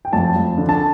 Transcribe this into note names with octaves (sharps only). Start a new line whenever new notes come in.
G5
F2 A5
F2
D3
A5